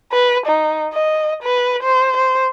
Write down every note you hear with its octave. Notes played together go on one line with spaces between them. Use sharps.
B4
D#4
D#5
B4
C5
C5